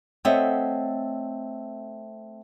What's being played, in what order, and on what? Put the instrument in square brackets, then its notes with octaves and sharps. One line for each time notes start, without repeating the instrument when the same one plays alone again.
[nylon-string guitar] A3 C4 C#5 D#5 E5 F#5